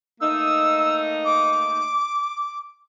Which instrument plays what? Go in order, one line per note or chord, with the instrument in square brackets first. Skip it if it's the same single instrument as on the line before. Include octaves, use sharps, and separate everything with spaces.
[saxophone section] A3 A#3 D#4 [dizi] E6
[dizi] D6